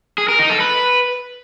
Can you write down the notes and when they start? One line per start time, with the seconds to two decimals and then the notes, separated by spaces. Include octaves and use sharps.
0.18 G#4
0.29 A#4
0.39 D#4
0.50 A4
0.60 B4